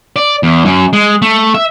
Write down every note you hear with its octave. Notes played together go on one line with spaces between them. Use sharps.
D5
E2
F#2
G#3
A3
E5